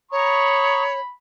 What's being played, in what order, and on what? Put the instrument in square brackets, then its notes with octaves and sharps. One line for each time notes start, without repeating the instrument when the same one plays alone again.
[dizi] C#5 [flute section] A#5 C#6 D#6 [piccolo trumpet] B5